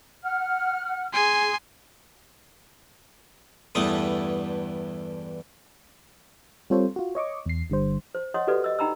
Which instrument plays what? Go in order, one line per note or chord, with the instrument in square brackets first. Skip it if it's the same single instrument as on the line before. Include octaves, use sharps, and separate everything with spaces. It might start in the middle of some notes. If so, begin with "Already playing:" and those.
[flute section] F#5 F6
[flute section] G#4 [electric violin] G#5 C6
[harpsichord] E2 G2 A3 D#6
[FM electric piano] G3 C4 F4 A4 C5 C#5
F4 F#4
C#5 D#5 C#6 D6
E2 C7
G1 D3 G3 C5
[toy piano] C5
C#5 D#5 F#5 C6 D#6
F#4 G4 A4 B4 D5
D#5 E6
D#4 G5 A#5 B5 E6